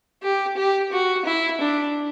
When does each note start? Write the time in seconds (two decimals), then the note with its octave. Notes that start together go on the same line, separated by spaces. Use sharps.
0.22 G4
0.57 G4
0.92 F#4
1.25 E4
1.61 D4